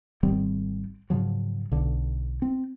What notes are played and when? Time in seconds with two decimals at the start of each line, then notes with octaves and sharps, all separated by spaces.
0.23 G#1 D#3 G3 C4
1.10 G#2 C#3 F3 F#3
1.71 B1 D3
2.42 C4